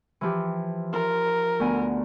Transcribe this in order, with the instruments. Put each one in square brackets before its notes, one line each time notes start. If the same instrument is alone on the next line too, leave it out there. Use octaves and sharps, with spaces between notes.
[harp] E3 F3 G4
[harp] F4 [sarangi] A#4
[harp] D2 B3 G#5